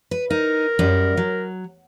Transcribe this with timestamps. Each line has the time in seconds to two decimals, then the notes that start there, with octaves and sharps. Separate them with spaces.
0.11 B4
0.30 D#4 A#4
0.79 F#2 G3
1.17 F#3